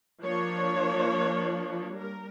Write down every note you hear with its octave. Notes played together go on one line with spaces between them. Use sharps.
F3 A#3 D4 C#5
G3 A#4